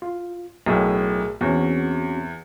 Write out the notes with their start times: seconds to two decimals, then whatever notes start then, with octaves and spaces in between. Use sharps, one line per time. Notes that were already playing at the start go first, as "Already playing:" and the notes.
0.02 F4
0.66 B1 A2 G#4 A#4
1.41 E2 C4 C#4 F#4